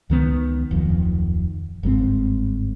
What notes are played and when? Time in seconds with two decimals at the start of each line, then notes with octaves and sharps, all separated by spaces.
0.10 C#2 D#3 B3
0.71 D1 F2 D#3
1.83 G1 G#2 E3 C4